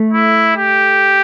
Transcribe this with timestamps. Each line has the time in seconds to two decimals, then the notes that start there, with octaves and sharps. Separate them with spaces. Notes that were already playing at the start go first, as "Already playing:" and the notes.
Already playing: A3
0.13 E4
0.57 G4